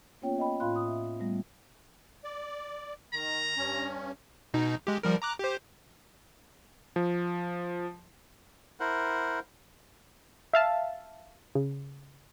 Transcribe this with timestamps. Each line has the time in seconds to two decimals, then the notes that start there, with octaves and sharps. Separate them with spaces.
0.22 A#3 B3 C#4 F4 C#5 G5
0.38 D#5 G5 B5
0.60 A2 F4 F5 B5 C6 F#6
0.76 D#6
0.87 E5
1.19 G3 A3 B3
2.24 D5
3.13 D#3 A#5
3.57 G2 C#4
4.54 B2 D#4
4.87 G#3 G4
5.03 F3 G3 A#4
5.22 A#5 D6 F#6
5.39 G4 C5
6.96 F3
8.80 E4 A#4 C5 F#5
10.53 E5 F5 A5
11.55 C#3